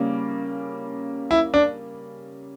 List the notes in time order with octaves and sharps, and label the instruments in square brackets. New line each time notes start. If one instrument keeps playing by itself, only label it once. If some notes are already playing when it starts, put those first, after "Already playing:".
Already playing: [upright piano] C#3 G3 A#3 C#4
[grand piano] E4
D4